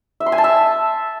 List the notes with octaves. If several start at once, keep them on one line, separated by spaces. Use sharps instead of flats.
E5
C6
G#5
A5
E5